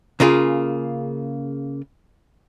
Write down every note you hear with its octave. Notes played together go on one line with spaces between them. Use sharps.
C#3 A#3 F4 G#4